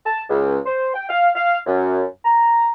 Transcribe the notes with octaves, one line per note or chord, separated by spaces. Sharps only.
A5
C#2
C5
G5
F5
F5
F#2
A#5